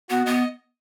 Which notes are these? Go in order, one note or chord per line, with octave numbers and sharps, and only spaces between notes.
B3 F#4
B3 D#5